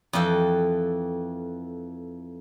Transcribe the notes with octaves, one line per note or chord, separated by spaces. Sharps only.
F2 E3 A4 G5